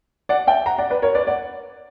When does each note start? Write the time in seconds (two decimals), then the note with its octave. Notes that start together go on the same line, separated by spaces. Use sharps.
0.29 D5 F#5
0.47 E5 G5
0.66 F#5 A#5
0.78 D5 F#5
0.90 B4 D5
1.02 A#4 C#5
1.15 B4 D5
1.27 D5 F#5